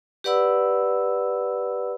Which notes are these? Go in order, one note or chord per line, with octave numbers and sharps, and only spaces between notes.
G4 B4 D5 F#5 B5 E6